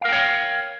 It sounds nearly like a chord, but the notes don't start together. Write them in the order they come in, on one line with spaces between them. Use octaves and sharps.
F5 A#4 G5 C#5